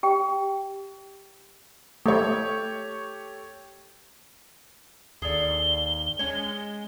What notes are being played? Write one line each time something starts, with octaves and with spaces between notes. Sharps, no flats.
G4 G5
A3 G4 A4 C#5
D#2 G#4 A4 D5 G7
G#3 C#4 C#5